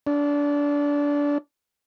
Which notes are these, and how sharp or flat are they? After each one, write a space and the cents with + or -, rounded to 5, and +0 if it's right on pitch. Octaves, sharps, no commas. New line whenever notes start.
D4 -25